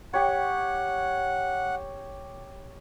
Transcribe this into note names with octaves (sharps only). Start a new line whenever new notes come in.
G4 C#5 F#5